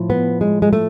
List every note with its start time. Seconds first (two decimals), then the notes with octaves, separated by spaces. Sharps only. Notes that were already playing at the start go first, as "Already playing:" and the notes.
Already playing: A2 F3
0.10 B3
0.41 G#3
0.62 G#3
0.73 A3